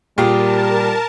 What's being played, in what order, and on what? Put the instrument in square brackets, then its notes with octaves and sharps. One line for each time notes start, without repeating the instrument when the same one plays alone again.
[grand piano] A#2 [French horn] G3 [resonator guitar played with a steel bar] F4 G4 G#4 [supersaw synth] A#4 A5